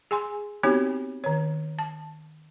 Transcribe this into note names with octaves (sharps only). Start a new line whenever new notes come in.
G#4 G#5 C6
B3 C4 D#4 F#4 G4 C#5
D#3 C#5
A5